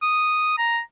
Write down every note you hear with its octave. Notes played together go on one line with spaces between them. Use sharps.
D#6
A#5